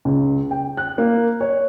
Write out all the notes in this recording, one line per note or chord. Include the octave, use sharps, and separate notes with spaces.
C#2
G5
F#6
A#3
C#5